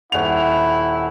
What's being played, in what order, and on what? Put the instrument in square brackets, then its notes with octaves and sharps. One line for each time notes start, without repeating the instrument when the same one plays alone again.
[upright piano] D#1 F7 [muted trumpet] E4 [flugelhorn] F#5